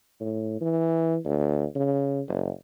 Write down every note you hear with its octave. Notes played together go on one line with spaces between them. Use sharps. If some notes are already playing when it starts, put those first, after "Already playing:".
A2
E3
D2
C#3
F#1